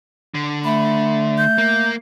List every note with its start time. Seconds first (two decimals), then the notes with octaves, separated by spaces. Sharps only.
0.34 D3
0.64 A3 B5
1.38 G6
1.58 A#3